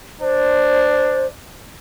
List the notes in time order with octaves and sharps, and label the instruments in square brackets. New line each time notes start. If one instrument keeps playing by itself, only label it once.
[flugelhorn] D4 [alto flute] C5